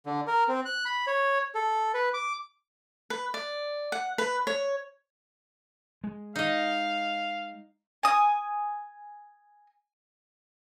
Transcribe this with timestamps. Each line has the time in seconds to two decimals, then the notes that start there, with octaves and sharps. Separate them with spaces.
0.06 D3
0.27 A#4
0.48 C4
0.65 F#6
0.85 B5
1.07 C#5
1.55 A4
1.94 B4
2.14 D6
3.10 B4
3.34 D5
3.92 F#5
4.18 B4
4.47 C#5
6.04 G#3
6.36 D#4 D#5 F5
8.03 G#5 D#6